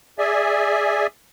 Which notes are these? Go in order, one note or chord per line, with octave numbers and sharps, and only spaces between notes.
G#4 D5 E5 G#5